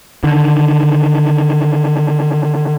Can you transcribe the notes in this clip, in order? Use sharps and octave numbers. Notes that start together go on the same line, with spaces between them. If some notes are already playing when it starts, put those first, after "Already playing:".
D3 D#3